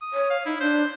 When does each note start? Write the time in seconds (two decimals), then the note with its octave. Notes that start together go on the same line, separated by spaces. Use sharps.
0.02 D#6
0.13 C#5
0.30 F5
0.45 D#4 E4
0.60 D4 C5